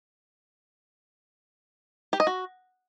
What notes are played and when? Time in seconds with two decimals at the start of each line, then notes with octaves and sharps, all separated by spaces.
2.13 G4
2.20 D#5
2.27 F#4